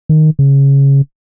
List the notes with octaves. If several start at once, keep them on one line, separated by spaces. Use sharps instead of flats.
D#3
C#3